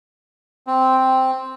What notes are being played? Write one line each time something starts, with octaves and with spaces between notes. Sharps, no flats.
C4